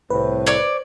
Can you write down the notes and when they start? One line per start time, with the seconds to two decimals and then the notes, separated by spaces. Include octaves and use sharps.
0.10 C2 A2 B4 C5
0.46 C#5 D5